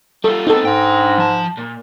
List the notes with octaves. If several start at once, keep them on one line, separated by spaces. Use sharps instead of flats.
G3 F4 A4
B3 C4 D#4 A4
G#2 D4 G5
F3 A5
A#2